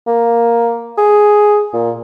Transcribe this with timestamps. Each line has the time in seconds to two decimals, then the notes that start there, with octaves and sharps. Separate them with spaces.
0.07 A#3
0.98 G#4
1.73 A#2